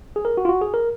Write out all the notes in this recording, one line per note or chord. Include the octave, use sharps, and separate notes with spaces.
G#4
A#4
F#4
F4
F#4
G#4
A#4